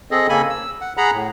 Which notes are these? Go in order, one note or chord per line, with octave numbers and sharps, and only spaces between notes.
C4 G#4 A4 D#5
C#3 A#3 A4 G#5 B5
E6
F#5
G#4 F#5 A#5 B5
A2